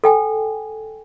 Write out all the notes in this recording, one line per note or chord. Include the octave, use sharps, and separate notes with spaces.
A4 G5 G#5